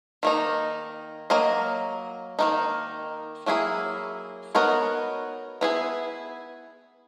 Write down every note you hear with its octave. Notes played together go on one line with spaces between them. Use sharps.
D#3 A#3 D#4
F#3 A#3 D#5
D#3 F#3 A#3 D#4
F#3 A#3 E4 G#4
B3 D#4 F#4 A#4 C#5
B3 E4 G#4